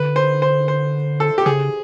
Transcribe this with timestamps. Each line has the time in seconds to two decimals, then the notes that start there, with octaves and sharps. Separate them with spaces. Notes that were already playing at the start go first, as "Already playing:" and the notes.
Already playing: D3 B4
0.16 C5
0.42 C5
0.68 C5
1.20 A4
1.38 G4
1.46 C#3 G#4